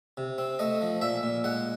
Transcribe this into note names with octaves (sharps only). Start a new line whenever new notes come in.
C3
C4
A3 D#5
F3
A#2 E5
A#2
G#3 F#5